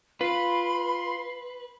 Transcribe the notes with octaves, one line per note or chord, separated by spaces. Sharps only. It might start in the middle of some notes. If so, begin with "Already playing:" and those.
F4 B4 B5 C6